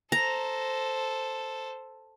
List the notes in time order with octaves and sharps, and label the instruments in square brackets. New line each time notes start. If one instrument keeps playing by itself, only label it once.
[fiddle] A4 C5 [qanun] A#5